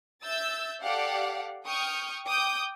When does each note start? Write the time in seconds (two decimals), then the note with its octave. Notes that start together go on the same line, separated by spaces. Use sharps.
0.22 E5 E6 G6 A6
0.81 G4 A4 D5 F5 F#5
1.65 G5 C#6 D#6 F6 G6
2.26 G5 D6 D#6 G6